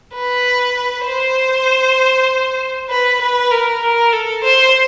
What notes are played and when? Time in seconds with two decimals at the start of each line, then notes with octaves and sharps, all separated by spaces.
0.14 B4
1.05 C5
2.90 B4
3.21 B4
3.51 A#4
3.82 A#4
4.12 A4
4.43 C5